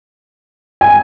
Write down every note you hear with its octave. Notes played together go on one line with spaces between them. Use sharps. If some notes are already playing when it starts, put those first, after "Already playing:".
G#5